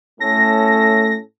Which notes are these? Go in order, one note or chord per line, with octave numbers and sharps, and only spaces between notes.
A2 A3 C#4 A4 A#6